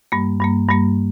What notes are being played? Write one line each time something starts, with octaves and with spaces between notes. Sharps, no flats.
G2 G3 A#3
G2 G3 A#3
G2 G3 A#3